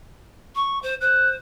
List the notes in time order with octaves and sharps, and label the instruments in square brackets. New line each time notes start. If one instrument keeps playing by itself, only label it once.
[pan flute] C#6
C5
[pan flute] C5 [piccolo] F#6